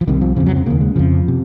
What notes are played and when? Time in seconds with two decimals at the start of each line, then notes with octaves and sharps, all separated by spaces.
0.01 F3
0.08 C2 C3 D#3
0.21 F3
0.36 F2 C#3 F3
0.46 F#3
0.56 C4
0.66 D#2 C#3 A#3
0.81 G#3
0.96 F2 C#3 F3
1.28 C3